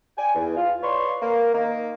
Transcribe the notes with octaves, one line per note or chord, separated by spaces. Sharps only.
D5 G5 G#5
E2
F4
B4 C#5 D5 C6 C#6
A#3
D#3 A#3